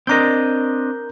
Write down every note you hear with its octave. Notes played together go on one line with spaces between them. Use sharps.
C4 D4 A#4 D#5 A#5 G6